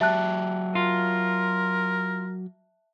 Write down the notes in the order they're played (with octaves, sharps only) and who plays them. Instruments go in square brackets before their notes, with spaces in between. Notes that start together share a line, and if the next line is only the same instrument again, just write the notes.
[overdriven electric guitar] F#3 G4 [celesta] E5 A5 F#6
[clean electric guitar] F4 [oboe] A#4